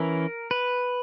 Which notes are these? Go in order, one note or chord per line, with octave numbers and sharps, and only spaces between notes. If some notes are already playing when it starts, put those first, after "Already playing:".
Already playing: E3 C#4 E4 A#4
B4